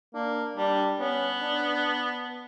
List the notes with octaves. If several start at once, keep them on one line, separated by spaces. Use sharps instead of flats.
A#3 D4
G3 D4
B3 C#4
D4